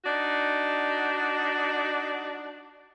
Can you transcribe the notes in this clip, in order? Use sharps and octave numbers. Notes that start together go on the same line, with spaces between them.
D4 D#4 F#4